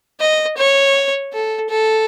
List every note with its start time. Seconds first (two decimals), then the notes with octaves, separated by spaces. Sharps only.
0.20 D#5
0.57 C#5
1.33 A4
1.69 A4